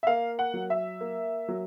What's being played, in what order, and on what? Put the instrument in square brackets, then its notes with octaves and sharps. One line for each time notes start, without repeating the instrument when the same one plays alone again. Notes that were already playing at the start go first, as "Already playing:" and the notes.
[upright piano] E5
A#3 F5
F#5
F#3
E5
A#3
F#3